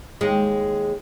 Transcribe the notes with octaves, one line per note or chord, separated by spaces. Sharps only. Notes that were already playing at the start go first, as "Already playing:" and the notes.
D#2 G#3